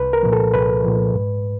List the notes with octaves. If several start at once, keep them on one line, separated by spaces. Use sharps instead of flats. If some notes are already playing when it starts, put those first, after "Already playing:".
Already playing: C2 B4
A#4
A#2 F3
A4
C2 B4
A#2 F3
G#2